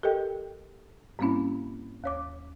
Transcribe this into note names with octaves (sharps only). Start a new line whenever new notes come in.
G4 A4 A#4 D#5 G5
G#2 G3 A#3 C4 C#4 E4
D#2 C#5 D6